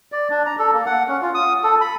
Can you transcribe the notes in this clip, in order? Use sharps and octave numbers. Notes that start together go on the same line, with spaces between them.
D5
D4
A#5
A4
A#3
F#5
C#4
F4
D#6
A4
B5